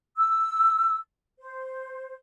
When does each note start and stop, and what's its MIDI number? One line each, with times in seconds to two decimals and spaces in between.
0.17 0.96 88
1.39 2.14 72